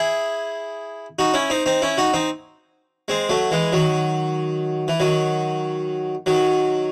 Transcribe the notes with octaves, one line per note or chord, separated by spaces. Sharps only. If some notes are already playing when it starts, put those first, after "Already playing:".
Already playing: E4 G#4
D#4 F#4
C#4 E4
C4 D#4
C4 D#4
C#4 E4
D#4 F#4
C4 D#4
G#3 C4
F#3 A3
E3 G#3
D#3 F#3
E3
D#3 F#3
D#3 F#3